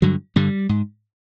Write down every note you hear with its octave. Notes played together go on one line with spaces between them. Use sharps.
G2 D3 F#3
G2 D3 G3
G#2